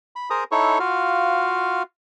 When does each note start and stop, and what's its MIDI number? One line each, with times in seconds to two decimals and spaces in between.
0.16 0.29 83
0.30 0.44 68
0.30 0.44 70
0.30 0.44 72
0.30 0.44 82
0.30 0.44 87
0.51 0.78 63
0.51 0.78 64
0.51 0.78 69
0.51 0.78 73
0.51 0.78 85
0.79 1.83 65
0.79 1.83 66
0.79 1.83 77